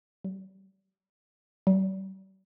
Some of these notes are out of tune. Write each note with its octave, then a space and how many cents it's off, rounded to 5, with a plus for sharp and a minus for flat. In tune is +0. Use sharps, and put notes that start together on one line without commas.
G3 -35
G3 -40